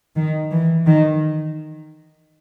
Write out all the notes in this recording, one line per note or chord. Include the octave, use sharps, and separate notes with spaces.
D#3
E3
D#3